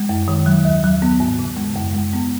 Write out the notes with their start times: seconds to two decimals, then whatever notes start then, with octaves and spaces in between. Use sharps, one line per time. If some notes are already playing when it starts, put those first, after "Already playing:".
Already playing: G#3
0.09 F#2
0.28 D#3
0.46 F#3
0.65 D#2
0.84 F#3
1.02 B3
1.20 G#2
1.39 C#3
1.57 G#3
1.76 F#2
1.94 G#3
2.13 B3